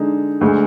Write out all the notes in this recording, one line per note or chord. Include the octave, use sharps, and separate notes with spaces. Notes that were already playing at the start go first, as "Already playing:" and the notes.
Already playing: D3 G#3 D#4
D2 D3 G#3